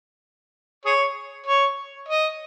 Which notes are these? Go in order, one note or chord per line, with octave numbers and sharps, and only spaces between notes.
G#4 C#5
C#5
D#5